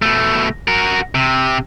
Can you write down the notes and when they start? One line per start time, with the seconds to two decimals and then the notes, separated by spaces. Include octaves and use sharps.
0.02 B2 A3
0.68 F#4 A#4
1.15 C3